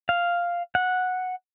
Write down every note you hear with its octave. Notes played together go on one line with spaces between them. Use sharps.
F5
F#5